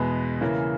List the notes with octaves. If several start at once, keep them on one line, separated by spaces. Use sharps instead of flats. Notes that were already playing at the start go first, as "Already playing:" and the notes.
Already playing: E2 B2 G#3 B3
C#3 E3 A#3 C#4